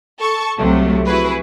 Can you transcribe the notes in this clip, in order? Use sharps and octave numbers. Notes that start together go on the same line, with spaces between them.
A4 A5 C#6
C2 C3 F3 F#3 A3
E4 F#4 G#4 B4